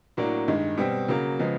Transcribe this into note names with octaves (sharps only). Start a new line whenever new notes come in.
A2 F#3 A#3 D4
G2 D#3 G#3
B2 G3 C4
C#3 F#3 A#3
C#3 F3 G#3 B3